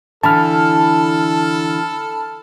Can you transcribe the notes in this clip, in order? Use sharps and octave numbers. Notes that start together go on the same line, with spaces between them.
D3 E3 A4 A5 B5 F6